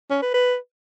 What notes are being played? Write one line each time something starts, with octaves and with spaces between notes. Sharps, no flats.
C#4
B4
B4